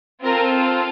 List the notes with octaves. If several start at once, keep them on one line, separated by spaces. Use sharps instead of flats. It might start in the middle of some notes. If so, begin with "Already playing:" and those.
C4 F4 A4 A#4